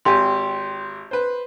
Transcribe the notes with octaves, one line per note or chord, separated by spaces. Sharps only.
G#1 G4 G#5 C6
B4 C5